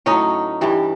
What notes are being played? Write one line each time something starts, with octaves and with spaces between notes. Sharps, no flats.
A2 F#3 C#4 D#4
G2 E3 G3